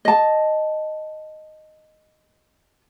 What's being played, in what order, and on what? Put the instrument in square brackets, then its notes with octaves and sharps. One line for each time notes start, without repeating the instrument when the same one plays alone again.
[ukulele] D#5 A5